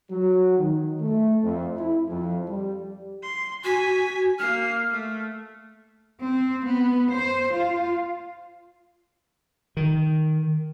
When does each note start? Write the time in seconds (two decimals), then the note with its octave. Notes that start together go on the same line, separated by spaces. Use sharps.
0.11 F#3
0.57 D#3
1.00 A3
1.43 F2
1.77 E4
2.09 F2
2.48 G3
3.23 C6
3.64 F#4 G#5 B6
4.39 A#3 F6 C7
4.92 A3
6.20 C4
6.66 B3
7.12 C5
7.54 F4
9.77 D#3